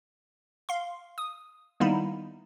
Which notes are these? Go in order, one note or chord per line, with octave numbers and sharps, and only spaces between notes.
F5 C6
D#6
D#3 G3 A#3 B3 D#4 E4